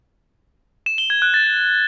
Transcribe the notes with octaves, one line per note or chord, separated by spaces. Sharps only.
E7
G7
G#6
F#6
A6